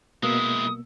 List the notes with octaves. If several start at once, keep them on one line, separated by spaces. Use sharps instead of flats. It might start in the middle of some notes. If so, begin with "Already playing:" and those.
B2 G#3 A#3 E4 D#6 E6